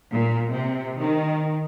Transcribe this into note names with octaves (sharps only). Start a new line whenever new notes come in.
A#2
C3
D#3